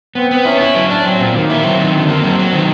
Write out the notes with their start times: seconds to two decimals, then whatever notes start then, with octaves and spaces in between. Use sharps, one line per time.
0.15 B3 C4
0.31 B3
0.45 C#4 E4
0.60 E4
0.75 F#3
0.90 D4
1.04 F#3 C4
1.20 A#2
1.35 D#3 A#3
1.50 E4
1.64 F#3 C4
1.79 D#3
1.93 D3
2.09 A#3
2.23 F#3
2.39 F#3
2.53 D#3